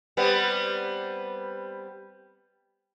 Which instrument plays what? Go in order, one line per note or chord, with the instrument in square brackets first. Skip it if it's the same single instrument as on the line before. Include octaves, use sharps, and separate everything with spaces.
[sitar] G3 B3 C4